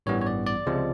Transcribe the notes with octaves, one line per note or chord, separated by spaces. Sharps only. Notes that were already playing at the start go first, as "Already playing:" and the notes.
A1 G2 E3 G3 B3 C#5
C#5
D5
D5
C#2 C3 F3 G#3